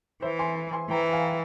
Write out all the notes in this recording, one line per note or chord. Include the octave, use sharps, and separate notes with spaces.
E3 C5 E5
G#5 C6
G#5 C6
E3 G5 A#5
F5 G#5